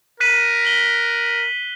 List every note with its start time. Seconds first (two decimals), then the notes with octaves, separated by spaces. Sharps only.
0.20 A#4 F#6 B6 D#7
0.63 D#7 F#7 G7